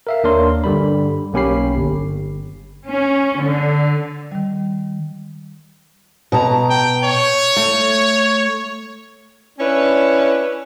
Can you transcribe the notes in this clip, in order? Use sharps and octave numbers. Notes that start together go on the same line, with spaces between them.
A#4 E5 F5
D#2 A#3 D4 A#4 C#5 C6
G2 D3 G3 B5
B1 A#3 C#4 G4 B5 C7
G1
C#4
D3
D#3 G3
B2 A5 A#5
G5
C#5
A3
C#4 D4 E4 B4 C#5